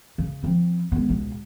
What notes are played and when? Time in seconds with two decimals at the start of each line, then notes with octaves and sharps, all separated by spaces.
0.18 C#3
0.43 F3 C4
0.92 G#3 B3
1.09 C#2 B2